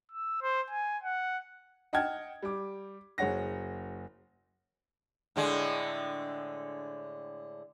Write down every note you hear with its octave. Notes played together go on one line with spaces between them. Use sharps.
E6
C5
G#5
F#5
D#5 F#5 G5 A5 F6 G#6
G3 D6
F#1 G#4 C#5 F#5 A#6
A2 D3 G#3